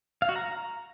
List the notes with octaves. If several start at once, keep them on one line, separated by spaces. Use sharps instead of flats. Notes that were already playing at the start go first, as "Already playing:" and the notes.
F5
F#4
A#5